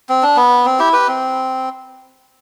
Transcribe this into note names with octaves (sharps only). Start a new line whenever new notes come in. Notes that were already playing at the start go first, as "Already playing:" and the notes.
C4
D4
B3
C4
E4 G4
G4 B4
C4